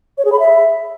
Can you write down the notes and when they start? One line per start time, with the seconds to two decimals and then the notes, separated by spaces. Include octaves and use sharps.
0.18 C#5
0.25 G#4
0.32 B5
0.39 E5